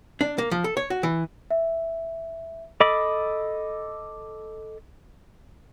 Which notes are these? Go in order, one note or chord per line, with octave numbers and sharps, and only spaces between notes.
D4
A#3
F3
A4
C#5
F#4
E3
E5
A4 D#5 B5 D6